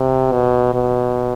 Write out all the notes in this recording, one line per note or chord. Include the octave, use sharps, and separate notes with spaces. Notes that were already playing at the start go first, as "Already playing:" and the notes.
Already playing: C3
B2
B2